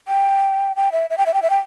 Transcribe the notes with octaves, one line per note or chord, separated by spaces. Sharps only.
G5
G5
E5
E5
G5
E5
G5
E5
G5